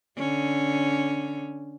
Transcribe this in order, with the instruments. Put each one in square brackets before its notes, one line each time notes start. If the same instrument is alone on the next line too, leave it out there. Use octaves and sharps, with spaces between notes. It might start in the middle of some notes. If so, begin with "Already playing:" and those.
[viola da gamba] D3 C#4